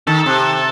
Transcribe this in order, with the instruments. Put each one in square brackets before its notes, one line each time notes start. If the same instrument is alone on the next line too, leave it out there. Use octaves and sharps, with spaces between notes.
[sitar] D#3 [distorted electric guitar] A4
[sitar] C3